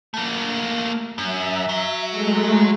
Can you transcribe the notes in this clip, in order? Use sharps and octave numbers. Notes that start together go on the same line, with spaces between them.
A3 A#3
F#2 E5
F#3
G#3 A3